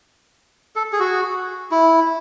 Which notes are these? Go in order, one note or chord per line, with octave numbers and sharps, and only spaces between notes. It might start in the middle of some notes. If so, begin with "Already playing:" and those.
A4
G#4
F#4
E4